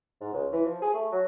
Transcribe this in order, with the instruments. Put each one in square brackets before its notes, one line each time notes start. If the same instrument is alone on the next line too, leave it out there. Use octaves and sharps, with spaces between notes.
[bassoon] G#2
C#2
E3
F3
G#4
A3
F#3